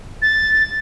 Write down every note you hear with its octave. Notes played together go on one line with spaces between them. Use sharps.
A6